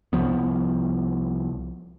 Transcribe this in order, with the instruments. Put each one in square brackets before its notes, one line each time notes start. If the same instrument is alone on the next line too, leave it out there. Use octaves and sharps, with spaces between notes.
[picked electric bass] C2 F3 B3